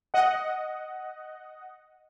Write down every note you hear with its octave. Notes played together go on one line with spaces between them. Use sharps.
D#5 F#5